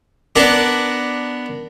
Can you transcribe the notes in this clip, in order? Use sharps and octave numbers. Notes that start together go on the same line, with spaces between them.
B3 D4 A#4 D6